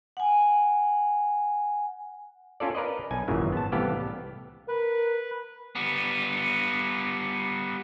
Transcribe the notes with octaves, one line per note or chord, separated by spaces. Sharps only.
F#5 G#5
C#4 F4 A4 D5
A#4 B4 D5 D#5
B1 D#4 G#5
G#1 F#2 A#2 C#3 E3
B3 A5
C2 A2 E3 B3 G4 F5
A#4 B4
G3 B3